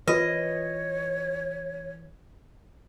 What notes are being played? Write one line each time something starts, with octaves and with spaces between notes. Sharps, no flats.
E3 F4 B4 C#5 D#5